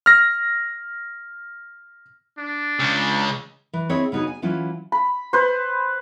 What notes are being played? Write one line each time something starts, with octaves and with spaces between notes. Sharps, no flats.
F6 A#6
D4
C#2 C#3
E3
C4 E4 G#4 C#5 D#5 E5
C#3 B3 D#4 F#4 G#4
G#5
E3 F#3 C#4 E4 F4
B5
B4 C5